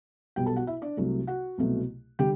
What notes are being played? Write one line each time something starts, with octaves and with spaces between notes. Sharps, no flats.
B1 B2 G3 G4 G5
A4 A5
F#4 F#5
E4 E5
D4 D5
C2 C3 F#3 A3
F#4 F#5
C2 B2 F#3 A3
D3 G3 G4 G5